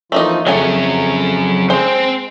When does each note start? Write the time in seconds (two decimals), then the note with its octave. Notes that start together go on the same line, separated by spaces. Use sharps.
0.12 E3 F3 A3 A#3 D#4 F4
0.47 F2 C#3 F#3 A3 C#4 G#5
1.70 G#3 C5 G5